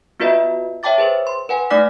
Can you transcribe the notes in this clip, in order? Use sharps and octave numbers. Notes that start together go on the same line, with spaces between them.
B3 F4 F#4 B4 D#5 E5
C#5 E5 G5 A5 D6 A6
G#4 B4 C5
C6
B4 F#5 G#5
A3 D#4 D5 D6 F6 B6